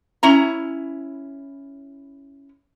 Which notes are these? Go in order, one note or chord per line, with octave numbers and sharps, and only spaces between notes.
C#4 E4 A#5